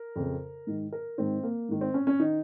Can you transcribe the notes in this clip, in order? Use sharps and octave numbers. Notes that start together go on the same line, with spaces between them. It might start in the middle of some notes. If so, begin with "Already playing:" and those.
Already playing: A#4
F2 C#3
G#2 D#3
A#4
G#2 D#3 C4
A#3
G#2 D#3
C4
C#4
C#4
D#3 D#4